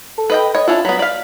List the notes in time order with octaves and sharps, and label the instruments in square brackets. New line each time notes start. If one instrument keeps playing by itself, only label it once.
[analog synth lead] A4
[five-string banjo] B4 D#5 G5
[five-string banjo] C#5 [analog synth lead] D#5
[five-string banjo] C#4 D4 E4 [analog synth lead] F4
[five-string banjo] F#3 B3 [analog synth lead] B6
[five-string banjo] D5 F5